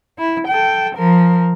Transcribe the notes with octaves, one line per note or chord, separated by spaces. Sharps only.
E4
A4 G5
F3 A#4